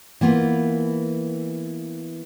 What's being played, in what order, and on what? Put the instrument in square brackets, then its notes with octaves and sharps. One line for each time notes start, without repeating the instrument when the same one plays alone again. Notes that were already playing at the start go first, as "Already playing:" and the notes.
[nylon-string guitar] E3 A#3 B3 F4